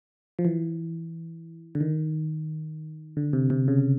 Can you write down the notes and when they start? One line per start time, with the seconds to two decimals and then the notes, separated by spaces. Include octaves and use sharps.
0.39 F3
0.45 E3
1.75 D3
1.80 D#3
3.17 D3
3.33 C3
3.50 C3
3.68 C#3